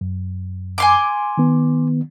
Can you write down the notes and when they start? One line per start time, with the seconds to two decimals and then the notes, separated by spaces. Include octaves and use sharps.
0.01 F#2
0.78 G#5 C6 D6
1.37 D#3 B3